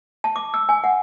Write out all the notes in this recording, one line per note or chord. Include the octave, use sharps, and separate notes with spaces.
A5
D6
E6
G#5
F#5